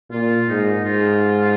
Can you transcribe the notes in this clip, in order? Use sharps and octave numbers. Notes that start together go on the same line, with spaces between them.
A#2 F4
G#2 D#4
G#2 F4